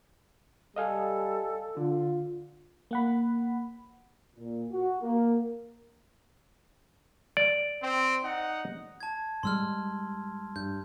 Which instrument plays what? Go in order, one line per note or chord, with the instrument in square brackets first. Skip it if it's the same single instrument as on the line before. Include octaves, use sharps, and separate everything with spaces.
[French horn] G3 [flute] A4 [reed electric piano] D#5 F5 G#5
[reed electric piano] D3 [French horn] F4
[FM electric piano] A#3 F#5 B5
[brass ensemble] A#2
F#4
A#3
[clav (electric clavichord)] D5
[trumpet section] C4
D#4 F#5
[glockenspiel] A5 G#6
[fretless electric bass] G#2 G3 G#3 [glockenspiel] C6 E6 F6
[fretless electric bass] G2 [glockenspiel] G6